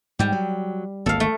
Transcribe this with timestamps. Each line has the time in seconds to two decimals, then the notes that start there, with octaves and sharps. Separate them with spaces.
0.19 G#2 G3 G4
0.32 F#3
1.06 G#1 D2 A#3 A4 F5
1.20 A3